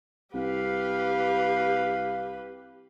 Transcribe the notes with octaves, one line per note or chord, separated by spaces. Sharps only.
C2 G4 B4 F5